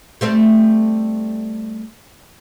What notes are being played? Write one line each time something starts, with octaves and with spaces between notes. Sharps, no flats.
G3 A3 C4